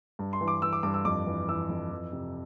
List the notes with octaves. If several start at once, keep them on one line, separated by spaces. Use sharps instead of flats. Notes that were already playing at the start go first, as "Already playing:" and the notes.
G2
C6
E3
D6
E3 E6
D6
G2 D6
E6
F2 D6
E3
E3 E6
F2
E3
C3